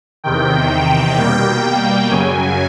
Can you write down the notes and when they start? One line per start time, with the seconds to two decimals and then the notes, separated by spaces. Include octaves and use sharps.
0.24 E2 C3 D#3 G5
1.17 B2 G3 A#3
2.10 F#2 C#3 F#3 G#5